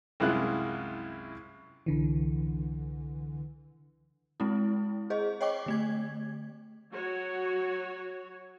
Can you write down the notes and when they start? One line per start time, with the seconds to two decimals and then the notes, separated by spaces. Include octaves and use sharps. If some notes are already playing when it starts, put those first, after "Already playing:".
0.20 C2 F#2 G#3 E4 F4 F#6
1.86 C2 D3 E3
4.40 G#3 C4 E4
5.10 G#4 C5 D#5
5.41 C#5 D#5 G5 C#6 D6
5.66 D3 A3 G#6
6.92 F#3 F#4 C#5